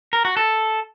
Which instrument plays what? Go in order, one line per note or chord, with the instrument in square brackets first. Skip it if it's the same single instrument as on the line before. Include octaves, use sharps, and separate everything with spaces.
[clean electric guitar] A#4
F#4
A4